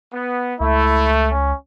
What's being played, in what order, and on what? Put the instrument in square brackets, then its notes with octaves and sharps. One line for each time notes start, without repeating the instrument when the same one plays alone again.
[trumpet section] B3
[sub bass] C#2 [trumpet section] A3 [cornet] E4
[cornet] C#4